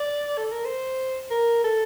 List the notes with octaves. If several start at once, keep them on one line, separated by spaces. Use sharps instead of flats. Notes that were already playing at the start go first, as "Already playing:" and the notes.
Already playing: D5
A4
A#4
C5
A#4
A4